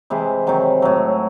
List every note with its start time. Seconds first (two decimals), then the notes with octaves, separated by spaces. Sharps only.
0.10 C3 E3 G#3 G#4
0.47 C3 D#3 F#3
0.82 A2 F#3